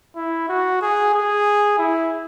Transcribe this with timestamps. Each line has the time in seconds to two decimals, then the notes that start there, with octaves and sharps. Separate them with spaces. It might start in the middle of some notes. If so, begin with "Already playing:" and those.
0.16 E4
0.49 F#4
0.81 G#4
1.14 G#4
1.78 E4